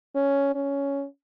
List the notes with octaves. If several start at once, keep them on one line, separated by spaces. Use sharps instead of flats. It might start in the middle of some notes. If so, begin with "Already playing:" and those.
C#4
C#4